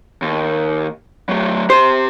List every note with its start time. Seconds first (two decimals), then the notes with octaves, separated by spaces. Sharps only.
0.22 D#2
1.29 F#3 A3
1.70 G4 C5 C6